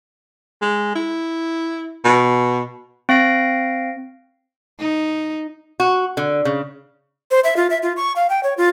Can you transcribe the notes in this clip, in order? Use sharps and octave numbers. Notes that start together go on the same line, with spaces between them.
G#3
E4
B2
C4 F5 A#6 D7
D#4
F#4
D3
C#3
C5
E5
F4
E5
F4
C#6
F5
G5
C#5
F4